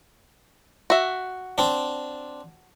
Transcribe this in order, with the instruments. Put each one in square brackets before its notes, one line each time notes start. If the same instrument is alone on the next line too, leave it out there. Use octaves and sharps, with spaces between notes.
[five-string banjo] F#4 E5
[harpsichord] C4 D4